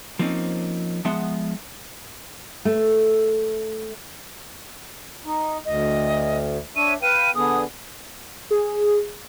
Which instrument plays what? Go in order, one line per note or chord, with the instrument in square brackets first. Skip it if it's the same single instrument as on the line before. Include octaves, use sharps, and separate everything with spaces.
[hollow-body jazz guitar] F3 A#3 C4 C#4 D#4
F3 G#3 B3 E5 F#5 C6
[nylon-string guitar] A3
[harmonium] D#4
[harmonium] D2 [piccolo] D#5
[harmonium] D4 C#5 E5 [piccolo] D#7
[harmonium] B4 F5 G5 [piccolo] D#7
[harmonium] D3 B3 G#4 [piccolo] D#6
[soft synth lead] G#4